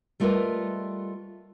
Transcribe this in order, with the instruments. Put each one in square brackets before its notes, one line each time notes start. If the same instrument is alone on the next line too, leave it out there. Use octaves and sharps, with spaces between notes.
[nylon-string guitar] G3 A3 F4 A#4 B4 D#5